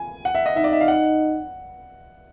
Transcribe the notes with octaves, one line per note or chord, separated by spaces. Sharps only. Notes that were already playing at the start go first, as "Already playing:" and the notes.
Already playing: G#5
F#5
E5
D#5
D#4 E5
D5
E5
F5
F#5